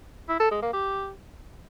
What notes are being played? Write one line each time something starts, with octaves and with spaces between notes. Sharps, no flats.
E4
A4
G#3
A#3
G4